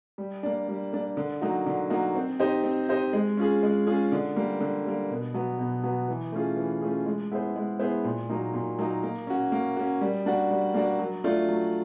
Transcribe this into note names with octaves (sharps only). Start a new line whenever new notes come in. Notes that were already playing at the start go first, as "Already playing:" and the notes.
G3
A#3 D4
G3
A#3 D4
D3
F#3 A#3 D#4 F#4
D3
F#3 A#3 D#4 F#4
C4
D#4 G4 C5 D#5
C4
D#4 G4 C5 D#5
G#3
C#4 F4 G#4
G#3
C#4 F4 G#4
D3
G3 A#3
D3
G3 A#3
B2
F#3 B3
B2
F#3 B3
E3
A3 C#4 F4 G#4
E3
A3 C#4 F4 G#4
G#3
B3 E4 G#4 C5
G#3
B3 E4 G#4 C5
A#2
F#3 A#3 D#4
A#2
F#3 A#3 D#4
A#3
C#4 F#4
A#3
C#4 F#4
G3
A#3 D4 F#4
G3
A#3 D4 F#4
F#3
A3 D4 F4
F#3